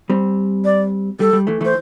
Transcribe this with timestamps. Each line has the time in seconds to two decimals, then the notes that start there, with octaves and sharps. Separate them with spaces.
0.10 G3 C4
0.65 D5
1.20 G3 A4
1.33 G3
1.47 E3 A3
1.61 E3 A3 C5